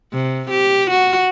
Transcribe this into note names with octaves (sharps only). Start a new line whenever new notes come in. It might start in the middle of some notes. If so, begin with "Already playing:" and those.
C3
G4
F#4